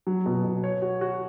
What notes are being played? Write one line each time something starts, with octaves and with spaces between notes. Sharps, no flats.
F#3
B2
B2
C#5
F#4
F#4